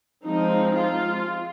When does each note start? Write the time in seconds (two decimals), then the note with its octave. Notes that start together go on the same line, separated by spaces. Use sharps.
0.24 F3 G#3 C4 D#4
0.75 F4